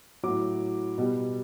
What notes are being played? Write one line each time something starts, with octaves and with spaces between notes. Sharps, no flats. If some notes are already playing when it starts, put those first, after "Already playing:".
A2 F#3 D6
B2 G3